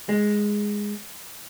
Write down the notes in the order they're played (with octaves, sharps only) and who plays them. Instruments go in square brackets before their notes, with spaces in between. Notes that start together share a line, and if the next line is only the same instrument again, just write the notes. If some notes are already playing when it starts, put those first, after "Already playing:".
[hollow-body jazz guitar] G#3